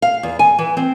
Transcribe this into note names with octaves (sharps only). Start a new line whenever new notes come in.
F5
E2
G#5
E3
C4